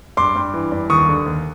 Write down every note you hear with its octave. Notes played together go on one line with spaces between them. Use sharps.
G2 C6 D6
G2
E3
G2
D#2 C#6 D#6
D3
D#2